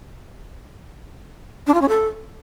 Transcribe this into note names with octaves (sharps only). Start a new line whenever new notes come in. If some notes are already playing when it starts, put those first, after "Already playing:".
D4
F4
C#4
A4